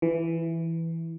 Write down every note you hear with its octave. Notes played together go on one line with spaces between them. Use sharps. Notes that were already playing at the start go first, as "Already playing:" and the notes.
E3